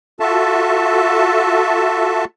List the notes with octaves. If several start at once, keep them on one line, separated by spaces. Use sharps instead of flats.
F4 F#4 A4 E5 A5